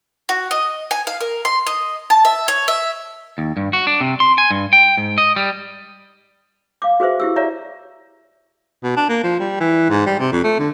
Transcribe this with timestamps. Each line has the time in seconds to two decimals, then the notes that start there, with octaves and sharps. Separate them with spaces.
0.29 F#4
0.51 D#5
0.91 G#5
1.07 F5
1.21 A#4
1.45 C6
1.67 D#5
2.10 A5
2.25 E5
2.48 C#5
2.68 E5
3.38 D#2
3.57 G2
3.73 F#4
3.87 D4
4.01 C3
4.20 C6
4.38 G#5
4.51 G2
4.73 G5
4.97 G#2
5.18 D#5
5.36 G3
6.82 F5 D6
7.00 F#4 G#4 B4 C5 E5
7.20 E4 G4 E6
7.36 C#5 D5 E5 A#5
8.84 B2
8.97 D4
9.09 A#3
9.23 F3
9.39 G3
9.60 E3
9.90 G#2
10.06 G3
10.19 C3
10.32 F2
10.44 A3
10.59 D3